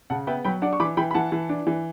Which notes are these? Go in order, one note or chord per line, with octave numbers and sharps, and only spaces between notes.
C#3 F#5 A5
B3 E5 G5
F#3 G5 B5
D4 D5 F#5
C#6
E3 B5 D6
E3 G5 B5
B5
E3 F#5 A5
E3
D4
E3